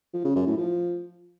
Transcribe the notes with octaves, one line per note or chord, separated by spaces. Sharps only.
F3
C#3
F#2
A2
F3